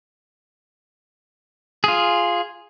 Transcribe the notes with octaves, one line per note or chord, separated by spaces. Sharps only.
F4 G#4